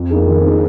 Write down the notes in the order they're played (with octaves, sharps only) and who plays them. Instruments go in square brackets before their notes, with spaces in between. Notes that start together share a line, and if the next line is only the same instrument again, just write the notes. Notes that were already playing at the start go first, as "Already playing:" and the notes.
Already playing: [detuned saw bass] F2
[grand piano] A#3 D#4 G#4
D#3
A#3 D#4 G#4